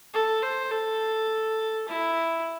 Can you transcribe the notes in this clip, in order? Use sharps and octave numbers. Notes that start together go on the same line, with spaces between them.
A4
C5
A4
E4